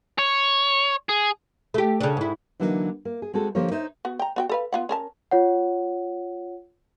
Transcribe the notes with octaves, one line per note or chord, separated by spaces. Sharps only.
C#5
G#4
A3 G4
C#3 D4
G#2 E4
D3 E3 F#3 A#3 C4 D#4
A#3
G#4
G#3 C4 F#4 G#4 A4
D3 F3 A#3 G4 A#4 C#5
D#4 C5 C#5 E5
B3 F#4
G5 A#5
B3 F#4 G5
A4 B4 F5
B3 F4 F#5
C#4 A#4 A5
F4 C#5 F#5